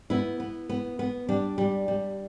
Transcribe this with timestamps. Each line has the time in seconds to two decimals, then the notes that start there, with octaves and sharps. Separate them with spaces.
0.10 B3 E4
0.40 B3
0.69 B3
0.99 B3
1.29 G3 D4
1.58 G3
1.88 G3